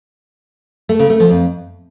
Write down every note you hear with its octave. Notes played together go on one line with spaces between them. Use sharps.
A3
C#3
A3
F3
F2